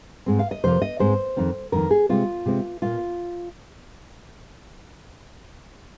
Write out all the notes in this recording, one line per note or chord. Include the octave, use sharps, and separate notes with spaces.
G#2 G#3 C4
F5
D#5
F2 C3 F3 A#3 C5
D#5
G#2 G#3 C4 C5
F2 D#3 C4
F2 D#3 A#3 A#4
G#4
C3 G#3 C4 F4
C3 G#3 C4
A#2 A#3 F4